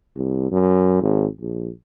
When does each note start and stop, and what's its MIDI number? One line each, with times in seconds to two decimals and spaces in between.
0.16 0.47 36
0.51 0.97 42
1.02 1.26 32
1.41 1.70 34